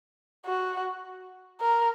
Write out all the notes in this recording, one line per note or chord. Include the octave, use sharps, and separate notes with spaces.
F#4
A#4